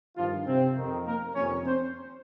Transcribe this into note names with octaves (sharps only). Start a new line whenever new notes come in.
G2 D#3 F3 F4
C3 C4
F2 D#3
A#3 A#4
F2 C3 D#3 C#4 C#5
C4 C5